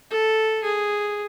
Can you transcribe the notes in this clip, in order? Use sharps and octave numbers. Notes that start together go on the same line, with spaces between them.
A4
G#4